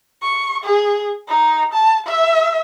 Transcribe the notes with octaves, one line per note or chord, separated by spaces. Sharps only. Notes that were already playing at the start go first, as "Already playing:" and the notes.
C#6
G#4
D#4
A5
E5